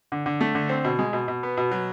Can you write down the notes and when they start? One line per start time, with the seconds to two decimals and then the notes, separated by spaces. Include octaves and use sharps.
0.12 D3
0.26 D3
0.41 A3
0.55 D3
0.69 C4
0.84 B2
0.99 G#3
1.13 B2
1.28 B2
1.43 B3
1.57 B2
1.71 F#3